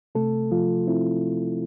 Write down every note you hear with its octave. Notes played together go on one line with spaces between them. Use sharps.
C3 A3 A4
F3 F4
C4 E4